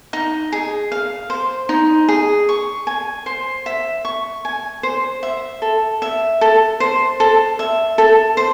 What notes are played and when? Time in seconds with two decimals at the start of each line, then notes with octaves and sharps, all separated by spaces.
0.13 D#4
0.52 G#4
0.92 F5
1.30 C5
1.69 D#4
2.08 G#4
2.49 C#6
2.87 G#5
3.26 C5
3.66 E5
4.05 C#6
4.45 G#5
4.83 C5
5.23 E5
5.62 A4
6.02 E5
6.41 A4
6.80 C5
7.20 A4
7.59 E5
7.98 A4
8.37 C5